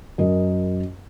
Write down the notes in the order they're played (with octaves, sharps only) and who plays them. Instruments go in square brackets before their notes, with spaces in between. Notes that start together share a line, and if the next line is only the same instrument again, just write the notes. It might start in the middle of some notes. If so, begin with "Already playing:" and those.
[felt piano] F#2 A#4 D#5